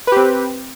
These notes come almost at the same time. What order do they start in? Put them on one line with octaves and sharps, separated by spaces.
B4 G4 C4